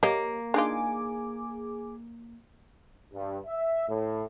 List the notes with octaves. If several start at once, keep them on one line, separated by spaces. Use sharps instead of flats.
A#3 G4 C#5 D#5
D4 D#4 F4 G#4 G#5 D6
G2
E5
A2